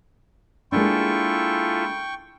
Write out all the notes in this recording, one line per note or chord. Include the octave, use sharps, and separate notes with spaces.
G#3 A#3 D4 E4 F4 A4 G5 C#6